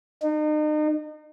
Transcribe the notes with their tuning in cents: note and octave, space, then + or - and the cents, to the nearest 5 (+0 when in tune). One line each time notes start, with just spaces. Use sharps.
D#4 -40